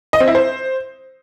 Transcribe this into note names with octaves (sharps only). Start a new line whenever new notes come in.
D#5
C4
E4
C5